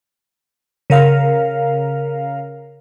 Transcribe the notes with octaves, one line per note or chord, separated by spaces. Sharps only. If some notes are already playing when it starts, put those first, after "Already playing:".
C#3 A#4 F5